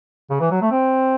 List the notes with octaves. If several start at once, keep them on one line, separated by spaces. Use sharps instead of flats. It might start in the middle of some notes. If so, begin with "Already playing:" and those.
C#3
E3
F#3
A3
C4